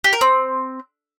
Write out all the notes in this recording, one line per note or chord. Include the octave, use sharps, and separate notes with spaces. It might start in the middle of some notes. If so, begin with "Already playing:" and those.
G4
A#4
C4